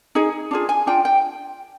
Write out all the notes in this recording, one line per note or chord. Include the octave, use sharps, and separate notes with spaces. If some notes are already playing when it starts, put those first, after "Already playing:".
D#4 G#4
D4 F4 G#4
G#5
D4 F4 G5
G5